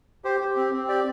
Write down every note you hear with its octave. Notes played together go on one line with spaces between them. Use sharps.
G4 C5
G4
C4
C4
G4 D5